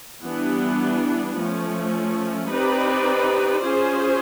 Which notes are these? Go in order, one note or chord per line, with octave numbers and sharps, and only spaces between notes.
E3 G3 B3 D4
F3 A3 C#4
C4 D#4 G4 B4 D5
C#4 F4 G#4 C5